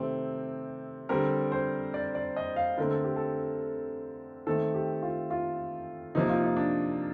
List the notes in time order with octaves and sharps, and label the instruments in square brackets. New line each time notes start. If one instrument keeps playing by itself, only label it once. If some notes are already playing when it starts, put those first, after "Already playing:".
Already playing: [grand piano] C3 D#3 A3 C4
D3 G3 C4 A#4
C5
D5
D5
D#5
F5
D3 A3 C4 A#4
A4
G4
A4
D#3 A3 C4 A4
G4
F4
F4
C3 F3 A#3 D#4
F4
D#4
D4